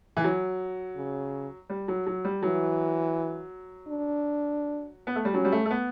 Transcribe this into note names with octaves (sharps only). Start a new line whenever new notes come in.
E3
F#3
C#3
G3
F#3
F#3
G3
E3 F#3
D4
B3
A3
G3
F#3 C#4
G3
A3
A3
B3